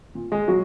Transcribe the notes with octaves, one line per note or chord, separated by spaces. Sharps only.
A#2
G#3 G#4
A#2 F#3 F#4